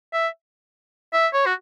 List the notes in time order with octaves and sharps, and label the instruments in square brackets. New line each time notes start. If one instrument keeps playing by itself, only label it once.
[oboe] E5
E5
C#5
F#4